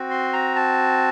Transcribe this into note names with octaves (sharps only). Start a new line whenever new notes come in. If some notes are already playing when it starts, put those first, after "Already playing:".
Already playing: C4 F#4
C6
A#5
A5